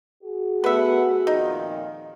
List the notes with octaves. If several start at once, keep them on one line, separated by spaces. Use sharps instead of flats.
F#4 G#4
A3 B3 B4 E5 F#5
F2 A#2 D#3 D#4